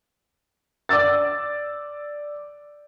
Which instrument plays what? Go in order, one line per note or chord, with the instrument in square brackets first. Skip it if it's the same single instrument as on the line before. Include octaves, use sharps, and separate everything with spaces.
[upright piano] D5 D6 E6 A6